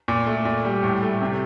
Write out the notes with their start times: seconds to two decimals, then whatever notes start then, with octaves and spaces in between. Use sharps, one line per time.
0.08 A#2
0.27 A3
0.45 A#2
0.65 G3
0.83 A2
1.03 A3
1.21 C3